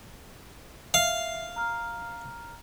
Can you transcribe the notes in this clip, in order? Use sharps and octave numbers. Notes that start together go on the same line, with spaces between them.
E5 F5
A#5 F6